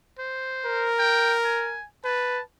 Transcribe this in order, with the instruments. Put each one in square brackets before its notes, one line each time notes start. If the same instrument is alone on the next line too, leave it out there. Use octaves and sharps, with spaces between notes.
[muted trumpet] C5
[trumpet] A#4
[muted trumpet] G5
G#5
[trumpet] B4 [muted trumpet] A5